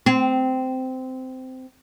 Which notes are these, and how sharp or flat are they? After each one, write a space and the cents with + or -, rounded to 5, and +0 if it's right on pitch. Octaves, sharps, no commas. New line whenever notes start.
C4 -15